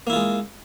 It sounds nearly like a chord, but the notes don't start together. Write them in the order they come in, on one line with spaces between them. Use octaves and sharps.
A#3 E4 F4 G#3